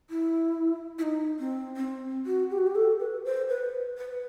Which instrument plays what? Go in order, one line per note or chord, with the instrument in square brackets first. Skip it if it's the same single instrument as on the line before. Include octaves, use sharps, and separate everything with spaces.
[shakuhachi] E4
E4
D#4
C4
C4
F#4
G4
F#4
G4
A4
B4
C5
B4
B4